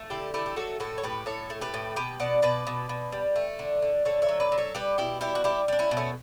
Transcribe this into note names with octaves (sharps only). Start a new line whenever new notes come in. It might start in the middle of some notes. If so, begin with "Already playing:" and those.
Already playing: A3
D3 E4 G4
A3 E4 G4
G4
F#3 F#4 A4
A2 F#4 A4
C#5
A2 G4 B4
A2 A4 C#5
A3
G4 B4
A2
B2 G4 B4
B2 D5 F#5
B2 B4 D5
B2
B2
G3
A3
D3
D3
D3 A4 C#5
C#5 E5
F#3
B4 D5
F#3
A4 C#5
G3 G4 B4
B2 E4 G4
G3 E4 G4
F#4
G3 E4 G4
G3 D4
C#4 E4
B2
A3 C#4